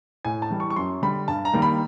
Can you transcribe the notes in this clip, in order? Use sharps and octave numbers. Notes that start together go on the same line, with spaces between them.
A2 G#5
A5
E3 G3
C#6
C#6
F#2 C6
D3 G3 B5
G2 A5
A#5
D#3 G3 A#3
B5